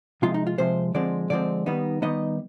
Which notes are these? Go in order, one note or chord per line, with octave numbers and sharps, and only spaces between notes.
C3 F3 G#3 F4
D#4
F4
C3 F3 G#3 C5
D3 F3 G#3 C4 D5
D3 F3 G#3 C4 D5
D#3 G3 B3 D#4
D#3 G3 B3 D#4 D#5